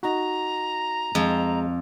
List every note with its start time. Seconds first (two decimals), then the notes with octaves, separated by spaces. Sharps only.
0.03 D#4 F#4 A#5
1.15 F2 G#3